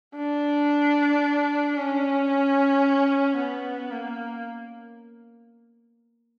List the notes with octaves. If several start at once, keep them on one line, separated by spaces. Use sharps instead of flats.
D4
C#4
B3
A#3